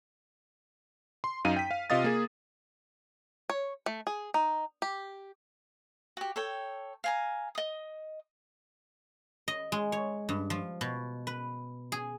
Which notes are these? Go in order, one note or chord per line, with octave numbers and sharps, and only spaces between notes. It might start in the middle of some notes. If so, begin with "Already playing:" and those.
C6
F#2 D#4 F5 D#7
G5 B6
F5
C3 F4 D#5 F5 D#6 A6
A#3 G#4
C#5
A3
G#4
D#4
G4
F#4 G4
A4 C#5 G5
F5 G#5 A#5
D#5 D#6
D#5
G#3
C#5
G2
F3
B2
B4
G#4